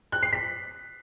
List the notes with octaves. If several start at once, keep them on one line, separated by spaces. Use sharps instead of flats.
F#6
C7
B6